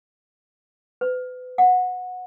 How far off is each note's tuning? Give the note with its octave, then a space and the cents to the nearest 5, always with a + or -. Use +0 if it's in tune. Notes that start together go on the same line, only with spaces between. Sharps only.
B4 +35
F#5 -20